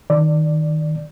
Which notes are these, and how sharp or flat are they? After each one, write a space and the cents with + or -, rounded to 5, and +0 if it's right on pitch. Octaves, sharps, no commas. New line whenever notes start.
D#3 +5 D5 +0